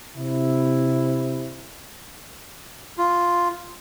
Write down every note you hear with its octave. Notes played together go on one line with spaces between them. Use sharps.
C3 E4
F4